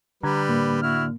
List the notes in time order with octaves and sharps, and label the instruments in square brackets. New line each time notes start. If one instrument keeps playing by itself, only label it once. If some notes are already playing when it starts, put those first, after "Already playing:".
[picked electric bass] D3 [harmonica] G3 B4 [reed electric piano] A#5 G#6
[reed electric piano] A2 A#3
[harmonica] E4 F#4 F6